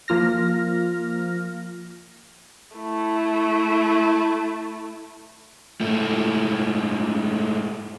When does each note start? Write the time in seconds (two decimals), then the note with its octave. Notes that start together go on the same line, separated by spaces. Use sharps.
0.08 F3 A#3 F4 F6 A#6
2.77 A3 E4
5.81 G#2 A3